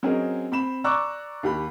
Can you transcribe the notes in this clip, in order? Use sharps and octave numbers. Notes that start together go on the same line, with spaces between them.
F#3 C4 C#4 G#4 A#4 D#5
C4 B5 E7
D5 A#5 C#6 D6 E6 F#6
D#2 G4 B5